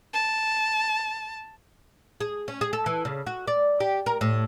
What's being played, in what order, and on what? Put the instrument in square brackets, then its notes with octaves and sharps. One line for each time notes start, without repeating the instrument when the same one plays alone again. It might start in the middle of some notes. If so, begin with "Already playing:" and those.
[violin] A5
[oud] G#4
C#4
G#4
A4
E3
C#3
F#4
D5
G4
A#4
A2